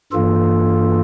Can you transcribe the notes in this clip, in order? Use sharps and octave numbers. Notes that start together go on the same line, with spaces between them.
G2 E3 A#3 F4 A4